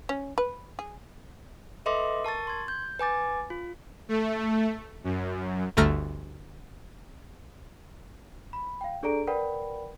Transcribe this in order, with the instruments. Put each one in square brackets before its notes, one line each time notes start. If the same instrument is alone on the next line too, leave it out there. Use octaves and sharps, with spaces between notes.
[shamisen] C#4
B4
G#4
[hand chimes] A4 B4 D#5 E5 C6 D6
A#4 A5 C#6 A6
C6 G#6
G6
B4 G#5 D6 A6
F4
[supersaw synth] A3
F#2
[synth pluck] G1 D2 A3 A#5 F6
[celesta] B5
F5 G5
D4 G#4 A4 D5 A#5 D7
A#4 B4 D5 F#5 G5 B5